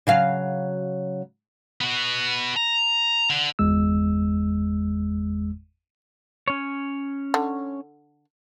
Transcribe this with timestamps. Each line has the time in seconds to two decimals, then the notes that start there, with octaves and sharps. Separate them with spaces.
0.07 C#3 F#3 F5
1.81 B3 F#4
2.57 A#5
3.30 D3
3.59 G1 E2 G#3 E6
6.48 C#4 C#5
7.34 D3